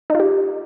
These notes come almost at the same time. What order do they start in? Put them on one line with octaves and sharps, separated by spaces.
D#4 F4 G4